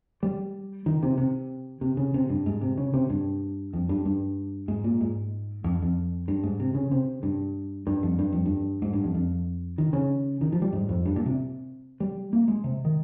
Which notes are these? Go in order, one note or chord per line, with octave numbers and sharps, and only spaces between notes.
G3
D#3
C3
C3
C3
C#3
C3
G2
G#2
C3
C#3
C3
G2
F2
G2
G2
G#2
A#2
G#2
F2
F2
G2
G#2
C3
C#3
C3
G2
G2
F2
G2
F2
G2
G#2
G2
F2
F2
D#3
C#3
D#3
F3
G3
G#2
F2
G2
A#2
C3
G3
A#3
G#3
C3
D#3